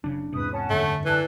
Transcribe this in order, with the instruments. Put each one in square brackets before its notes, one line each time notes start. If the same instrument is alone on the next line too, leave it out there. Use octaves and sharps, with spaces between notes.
[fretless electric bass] F#1 C#3 [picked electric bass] D4
[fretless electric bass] E2 G#2 C3 [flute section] B4 D#6
[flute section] C#4 F#5 A5
[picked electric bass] F#2 D3 [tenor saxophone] A3
[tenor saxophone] E3 [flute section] A4 D5 F#6